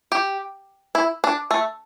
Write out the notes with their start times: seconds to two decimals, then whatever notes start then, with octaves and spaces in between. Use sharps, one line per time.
0.12 G4
0.95 E4
1.24 D4
1.51 A3